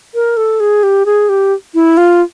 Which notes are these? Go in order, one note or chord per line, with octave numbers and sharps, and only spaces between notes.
A#4
A4
G#4
G4
G#4
G4
E4
F4